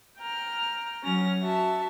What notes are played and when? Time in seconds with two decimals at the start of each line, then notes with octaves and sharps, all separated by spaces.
0.19 G5 A#5 F6
1.04 F#3 C#4 F6 A#6
1.42 F#4 E5 A5